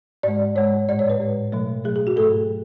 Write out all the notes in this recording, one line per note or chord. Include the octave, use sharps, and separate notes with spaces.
G#2 G#3 D5
G#2 G#3 C#5
A2 G#3 D5
C#5
B4
A2 G#3
B2 F#3 A3
B2 F#3 A3 G#4
G#4
F#4
G#2 F#3 A3 A4